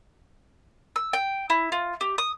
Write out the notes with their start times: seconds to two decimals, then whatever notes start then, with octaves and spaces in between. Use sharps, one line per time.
0.96 E6
1.13 G5
1.50 E4
1.72 F4
2.01 G4
2.18 D#6